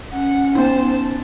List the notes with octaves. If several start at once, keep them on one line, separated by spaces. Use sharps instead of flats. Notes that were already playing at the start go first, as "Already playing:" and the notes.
C#4 F#5
B3 D#4 C5 A5